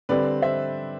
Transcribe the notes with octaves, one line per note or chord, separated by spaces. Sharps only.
D3 G3 C4 B4 D5
C5 E5